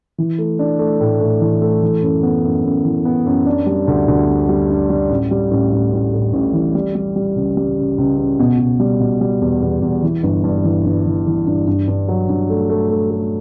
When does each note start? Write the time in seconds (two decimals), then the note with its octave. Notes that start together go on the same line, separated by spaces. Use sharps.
0.18 E3
0.38 A3
0.59 D4
0.79 A3
1.00 A2
1.21 A2
1.41 E3
1.61 A3
1.82 E3
2.03 F#2
2.23 B3
2.44 F#2
2.64 F#2
2.84 E3
3.05 B3
3.26 F#2
3.46 D4
3.67 G3
3.87 D2
4.08 D2
4.29 G3
4.49 G3
4.70 D4
4.90 G3
5.10 A1
5.31 G3
5.51 A1
5.72 A1
5.92 A1
6.13 A2
6.33 A1
6.53 E3
6.75 G3
6.95 G3
7.16 G3
7.36 C#2
7.57 G3
7.78 C#3
7.98 C#2
8.18 C#3
8.39 B2
8.59 B2
8.80 G3
9.00 B2
9.21 G3
9.41 E2
9.62 E2
9.82 E2
10.03 E3
10.23 G1
10.44 G2
10.64 E3
10.85 G1
11.06 E3
11.26 E3
11.47 G2
11.67 G2
11.88 G2
12.08 F#3
12.29 G2
12.50 A3
12.70 A3
12.90 A3
13.11 A3